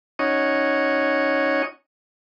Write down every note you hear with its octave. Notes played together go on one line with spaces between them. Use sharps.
C#4 D#4 F#4 C#5 D#5